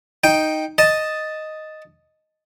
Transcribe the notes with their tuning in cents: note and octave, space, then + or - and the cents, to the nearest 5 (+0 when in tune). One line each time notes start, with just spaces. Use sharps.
D#4 +0 G5 +0
D#5 +0 A5 +0